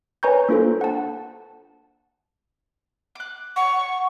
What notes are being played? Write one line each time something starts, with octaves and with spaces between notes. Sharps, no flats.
B4 C#5 G#5 A#5 C#6 G6
A#3 D4 F4 A4 C5
F#5 A5
D6 F#6
F#5 C#6